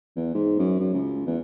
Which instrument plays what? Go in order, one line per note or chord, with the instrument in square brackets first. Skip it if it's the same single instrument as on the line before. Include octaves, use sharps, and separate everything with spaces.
[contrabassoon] E2
G#2
F#2
F#2
C#2
E2